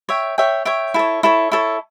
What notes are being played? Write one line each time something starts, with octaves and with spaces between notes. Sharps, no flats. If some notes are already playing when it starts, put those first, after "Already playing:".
C#5 E5 G5
C#5 E5 G5
C#5 E5 G5
E4 A4 C#5
E4 A4 C#5
E4 A4 C#5